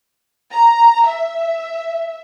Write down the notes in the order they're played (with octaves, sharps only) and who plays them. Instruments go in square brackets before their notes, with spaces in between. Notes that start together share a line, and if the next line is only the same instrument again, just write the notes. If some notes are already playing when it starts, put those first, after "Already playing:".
[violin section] A#5
E5